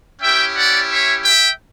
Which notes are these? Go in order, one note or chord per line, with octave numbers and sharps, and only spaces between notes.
C#4 E4 G4 E5 G5
D5 F#5
C#5 E5
E5 G5